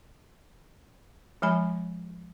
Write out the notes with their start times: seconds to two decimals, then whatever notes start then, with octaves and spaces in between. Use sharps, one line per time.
1.42 F3 G#3 G#5 B5